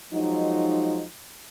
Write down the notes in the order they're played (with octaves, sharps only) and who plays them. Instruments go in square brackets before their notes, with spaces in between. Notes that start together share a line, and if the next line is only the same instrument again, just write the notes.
[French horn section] F3 F#3 G#3 D#4